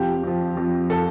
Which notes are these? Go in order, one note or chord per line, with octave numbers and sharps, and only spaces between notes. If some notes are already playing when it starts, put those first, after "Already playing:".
Already playing: F2 F3 G4
F2 F3
F2 F3
F3 A4